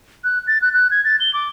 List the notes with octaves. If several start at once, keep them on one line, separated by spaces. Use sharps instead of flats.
F#6
A6
F#6
F#6
G#6
A6
G7
D6